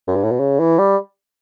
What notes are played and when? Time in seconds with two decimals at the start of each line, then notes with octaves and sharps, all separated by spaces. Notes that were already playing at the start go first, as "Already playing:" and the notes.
0.07 F#2
0.16 G2
0.24 A2
0.31 B2
0.40 C#3
0.60 E3
0.79 G3